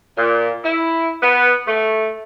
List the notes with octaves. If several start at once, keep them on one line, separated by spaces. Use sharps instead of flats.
A#2
E4
B3
A3